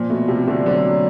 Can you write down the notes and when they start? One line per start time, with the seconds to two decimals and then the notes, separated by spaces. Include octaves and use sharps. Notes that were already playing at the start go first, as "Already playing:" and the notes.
Already playing: A#2 F3
0.10 B2 A3
0.28 C3 F3
0.47 D3 A3
0.65 D3 F#3
0.85 F#3